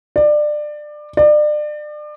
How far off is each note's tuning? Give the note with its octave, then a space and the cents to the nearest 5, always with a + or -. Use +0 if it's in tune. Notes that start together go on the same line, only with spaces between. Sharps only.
D5 +25
D5 +35